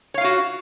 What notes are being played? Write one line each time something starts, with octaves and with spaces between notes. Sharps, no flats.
F4 F#4 C#5 F5